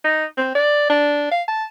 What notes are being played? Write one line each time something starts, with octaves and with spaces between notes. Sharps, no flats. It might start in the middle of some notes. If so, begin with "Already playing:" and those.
D#4
C4
D5
D4
F5
A5